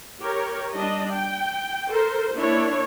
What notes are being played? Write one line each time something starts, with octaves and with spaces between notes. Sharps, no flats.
G4 A#4 C#5
G3 D4 D#5
G5
A4 A#4 C5
A#3 D4 E4 C#5